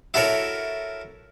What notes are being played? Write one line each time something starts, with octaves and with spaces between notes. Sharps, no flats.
E4 F#4 A4 A#4 C#5